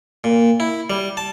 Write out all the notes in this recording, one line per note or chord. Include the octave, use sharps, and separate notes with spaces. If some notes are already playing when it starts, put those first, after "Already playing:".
A#2
E4
G3
A5